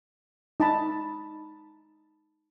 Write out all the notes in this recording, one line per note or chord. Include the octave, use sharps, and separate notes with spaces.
D#4 A5 B5